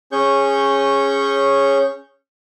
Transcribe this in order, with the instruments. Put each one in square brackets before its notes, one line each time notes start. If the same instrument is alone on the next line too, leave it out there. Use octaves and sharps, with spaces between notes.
[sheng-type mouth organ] C#4 G#4 C#5 C#6 G6